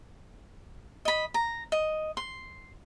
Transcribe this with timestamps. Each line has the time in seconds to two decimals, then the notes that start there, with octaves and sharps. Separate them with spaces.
1.05 D#5 B5
1.34 A#5
1.72 D#5
2.17 C6